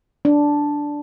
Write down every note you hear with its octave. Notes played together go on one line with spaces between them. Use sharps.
D4